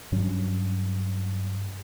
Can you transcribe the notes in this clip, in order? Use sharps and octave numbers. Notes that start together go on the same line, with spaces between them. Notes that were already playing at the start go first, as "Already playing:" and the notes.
G2 F#3 C#4